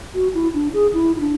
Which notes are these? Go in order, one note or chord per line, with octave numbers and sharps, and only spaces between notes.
F#4
E4
D4
G#4
E4
E4
D4